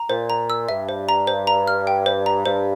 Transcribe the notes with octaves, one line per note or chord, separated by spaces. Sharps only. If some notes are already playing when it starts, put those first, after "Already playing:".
Already playing: A#5
A#2 C5
A#5
E6
G2 E5
C5
A#5
C5
A#5
F6
G5
C5
A#5
G2 C5